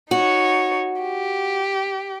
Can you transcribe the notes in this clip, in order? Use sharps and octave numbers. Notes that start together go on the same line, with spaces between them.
D#4 F#4 C#5
G4